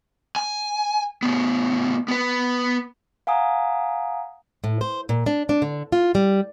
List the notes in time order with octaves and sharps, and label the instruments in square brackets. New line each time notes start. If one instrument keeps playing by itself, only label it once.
[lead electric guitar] G#5
A2 B3
B3 B4
[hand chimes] F5 F#5 G#5 A#5 D#6
[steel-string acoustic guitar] A2
C5
A#2
D4
D4
D3
F4
G3